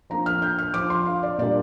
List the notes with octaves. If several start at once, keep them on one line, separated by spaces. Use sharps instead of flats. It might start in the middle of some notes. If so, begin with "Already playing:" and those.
F3 A#3 D4 A#5
F6
G6
F6
F3 D4 D6
C6
F5
D5
A#2 G3 A#3 D4 D5